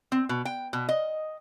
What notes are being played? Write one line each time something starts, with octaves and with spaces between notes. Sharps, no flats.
C4
B2
G5
B2
D#5